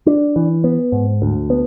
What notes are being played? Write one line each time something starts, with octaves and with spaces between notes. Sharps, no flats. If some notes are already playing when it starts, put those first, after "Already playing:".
D4
E3
B3
G#2
D2
B3